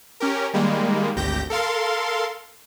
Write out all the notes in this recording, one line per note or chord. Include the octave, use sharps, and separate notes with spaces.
C#4 G4 A#4
D#3 G3 G#3 A#3
G#1 D2 G4 G6 A#6
A4 A#4 F5 C6